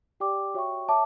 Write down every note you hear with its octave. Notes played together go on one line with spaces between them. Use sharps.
G4 D5 G5 D6
F#4 C#5 E5 G5 C#6
C#5 E5 A5 D6